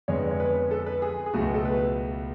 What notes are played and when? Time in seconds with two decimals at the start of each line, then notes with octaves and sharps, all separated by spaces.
0.08 F2 D3 G#3 B3 C#5
0.31 C#5
0.40 B4
0.55 B4
0.71 A4
0.86 B4
1.02 G#4
1.26 G#4
1.34 C#2 B2 F#3 A3 F#4
1.54 A4
1.65 B4